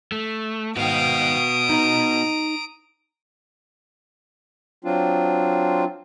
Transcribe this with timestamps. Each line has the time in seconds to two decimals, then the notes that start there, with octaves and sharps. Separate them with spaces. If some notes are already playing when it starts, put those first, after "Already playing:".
0.12 A3
0.77 G#2 D#3 B3 F#4 F5 G5 D#6 D7
1.69 D#4 D#5 A#5
4.85 F#3 C4 D4 F4